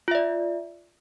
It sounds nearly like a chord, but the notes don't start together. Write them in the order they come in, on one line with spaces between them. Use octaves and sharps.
F4 E5 D5